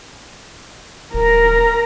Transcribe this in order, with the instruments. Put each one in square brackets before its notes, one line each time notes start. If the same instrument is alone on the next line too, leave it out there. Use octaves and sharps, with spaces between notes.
[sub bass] D1 [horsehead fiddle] A#4 A#5